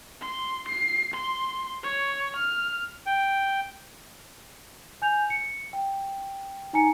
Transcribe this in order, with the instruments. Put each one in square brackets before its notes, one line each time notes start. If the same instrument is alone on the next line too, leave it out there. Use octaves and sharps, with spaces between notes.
[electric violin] C6
C7
C6
C#5
F6
[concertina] G5
[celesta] G#5 G6 F7
C#7
G5
D#4 G#5 A#5 C#7